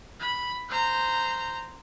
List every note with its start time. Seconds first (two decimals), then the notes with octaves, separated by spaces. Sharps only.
0.20 B5
0.69 C5 A#5